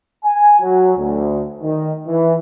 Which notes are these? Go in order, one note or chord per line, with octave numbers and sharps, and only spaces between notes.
G#5
F#3
D2
D#3
E3